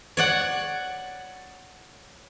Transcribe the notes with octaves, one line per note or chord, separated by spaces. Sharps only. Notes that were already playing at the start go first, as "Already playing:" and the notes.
C#5 D5 F#5